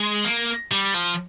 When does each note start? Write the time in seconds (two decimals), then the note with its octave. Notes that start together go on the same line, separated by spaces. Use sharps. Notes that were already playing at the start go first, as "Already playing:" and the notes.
Already playing: G#3
0.25 A#3
0.71 G3
0.94 F3